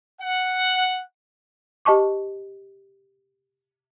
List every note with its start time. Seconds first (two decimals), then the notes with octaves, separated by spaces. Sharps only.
0.21 F#5
1.85 G4 D#5 A5 C#6 D6